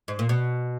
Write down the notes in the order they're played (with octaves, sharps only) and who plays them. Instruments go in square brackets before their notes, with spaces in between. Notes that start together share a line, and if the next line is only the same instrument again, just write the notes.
[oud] G#2
A#2
B2